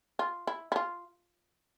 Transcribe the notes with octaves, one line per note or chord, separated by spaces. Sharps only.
F4
E4
E4
F4